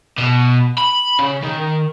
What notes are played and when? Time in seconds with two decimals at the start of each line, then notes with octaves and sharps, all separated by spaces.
0.18 B2
0.78 B5
1.19 C#3
1.43 D#3